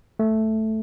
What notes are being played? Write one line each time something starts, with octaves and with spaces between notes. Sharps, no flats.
A3